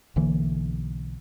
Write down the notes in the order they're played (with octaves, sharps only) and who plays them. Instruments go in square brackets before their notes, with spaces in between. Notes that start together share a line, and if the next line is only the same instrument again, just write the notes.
[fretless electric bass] B1 D3 E3 A#3